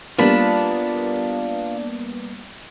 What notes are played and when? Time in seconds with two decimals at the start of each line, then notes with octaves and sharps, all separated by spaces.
0.19 G3 A#3 B3 D4 F4 A5 B5